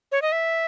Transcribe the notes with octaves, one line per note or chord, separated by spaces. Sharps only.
C#5
D#5
E5